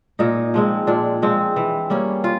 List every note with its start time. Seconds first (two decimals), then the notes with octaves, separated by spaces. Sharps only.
0.19 A#2 D#4
0.54 F3 G#3 C4
0.87 A#2 D4
1.22 F3 G#3 C4
1.56 E3
1.90 G3 A#3 C#4
2.24 F4